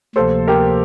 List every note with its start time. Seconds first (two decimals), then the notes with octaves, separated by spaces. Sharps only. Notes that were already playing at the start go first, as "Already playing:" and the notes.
0.16 D2 C3 F3 A#3 A4 C5
0.48 G4 A#4